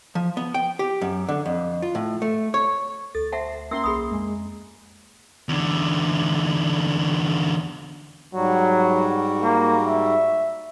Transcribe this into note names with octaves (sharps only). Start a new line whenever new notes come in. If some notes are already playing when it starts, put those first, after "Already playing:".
F3
B3
G5
G4
F#2
D3
F2
F4
A2
A3
C#5
D2 A4 A6
C5 E5 F#5 A5
A#3 C#4 E5 C6 E6
B1 G#4 B5 D#6
F2 G#3
E2 D3
G#2 F#3 G3 F#4
A#3
E5